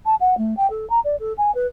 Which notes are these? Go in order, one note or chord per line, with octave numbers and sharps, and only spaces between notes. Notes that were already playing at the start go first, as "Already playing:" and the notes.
A5
F#5
A3
G5
A4
A#5
D5
A4
G#5
B4